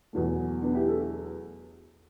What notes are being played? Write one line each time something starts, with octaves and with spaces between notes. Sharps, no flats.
E2 B2 F#3 A3
B3 D4
E4 G4
A4